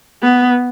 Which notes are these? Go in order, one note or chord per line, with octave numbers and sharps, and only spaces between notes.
B3